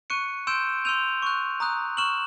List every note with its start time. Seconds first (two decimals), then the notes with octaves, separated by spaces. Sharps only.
0.10 C#6 F#6 C#7 D#7
0.47 C6 E6 G6 D7 E7
0.85 C6 E6 G6 D#7 F7
1.22 C#6 F#6
1.60 A#5 D#6 F#6
1.97 C#6 F6 E7 F#7